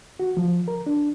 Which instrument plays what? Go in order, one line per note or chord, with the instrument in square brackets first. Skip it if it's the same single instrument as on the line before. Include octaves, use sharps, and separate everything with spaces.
[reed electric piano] F#4
F3
A#4
D4